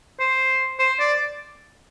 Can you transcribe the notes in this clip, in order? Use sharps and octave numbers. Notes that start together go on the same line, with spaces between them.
C5
C5
D5